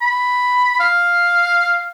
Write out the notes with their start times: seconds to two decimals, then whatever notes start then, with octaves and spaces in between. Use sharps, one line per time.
0.01 B5
0.80 F5